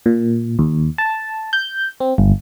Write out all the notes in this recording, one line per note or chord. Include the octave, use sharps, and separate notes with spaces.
A#2
D#2
A5
G6
C4
G1